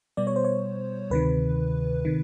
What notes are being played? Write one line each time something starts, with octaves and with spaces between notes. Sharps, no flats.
B2 G3 B3 D5
C#5
C5
C#5
D2 C3 D#3 B4
C3 D#3